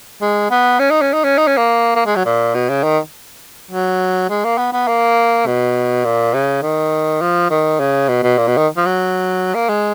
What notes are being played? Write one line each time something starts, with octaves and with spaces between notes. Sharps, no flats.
G#3
B3
C#4
D#4
C#4
D#4
C#4
D#4
C#4
A#3
A#3
G#3
F#3
A#2
B2
C#3
D#3
F#3
G#3
A#3
B3
B3
A#3
B2
A#2
C#3
D#3
F3
D#3
C#3
B2
B2
A#2
B2
D#3
F3
F#3
A#3
G#3